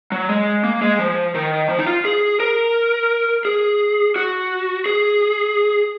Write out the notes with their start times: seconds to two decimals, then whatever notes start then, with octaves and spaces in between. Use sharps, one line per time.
0.12 F#3
0.29 G#3
0.64 A#3
0.82 G#3
0.99 F3
1.35 D#3
1.69 F3
1.78 D#4
1.87 F4
2.05 G#4
2.40 A#4
3.45 G#4
4.16 F#4
4.86 G#4